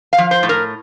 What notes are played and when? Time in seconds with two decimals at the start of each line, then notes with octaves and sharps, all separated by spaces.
0.13 F5
0.18 F3
0.31 C5
0.43 A2
0.49 A#4